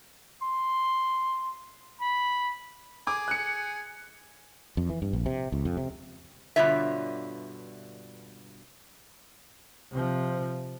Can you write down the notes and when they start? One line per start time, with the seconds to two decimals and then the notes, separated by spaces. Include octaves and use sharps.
0.43 C6
2.01 B5
3.07 G#4 D6
3.28 F#6 C#7
4.77 F2
4.89 E3
5.02 G2
5.13 A#1
5.26 C3
5.52 C#2
5.65 F2
5.77 C3
6.56 G2 B2 D3 F4 C#5 E5
9.91 C3 F3